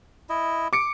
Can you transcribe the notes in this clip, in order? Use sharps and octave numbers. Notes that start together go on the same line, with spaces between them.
E4 D#5
D6 C#7 D7